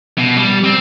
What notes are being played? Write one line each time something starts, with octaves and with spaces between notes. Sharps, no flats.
B2
G3
C4